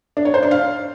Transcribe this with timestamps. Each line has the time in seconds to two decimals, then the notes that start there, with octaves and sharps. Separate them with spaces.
0.17 D4
0.25 C#5
0.34 C5
0.43 D4
0.51 F5